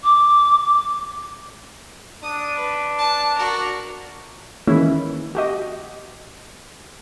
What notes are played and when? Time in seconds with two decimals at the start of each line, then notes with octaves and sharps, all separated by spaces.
0.03 D6
2.23 D4 D#6
2.56 B4
2.98 A5
3.37 F#4 A#4
4.67 D#3 E3 G#3 A#3 C#4 E4
5.35 F#4 G4 D#5